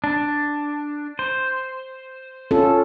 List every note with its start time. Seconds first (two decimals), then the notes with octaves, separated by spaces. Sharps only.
0.04 D4
1.19 C5
2.51 C#4 F4 A4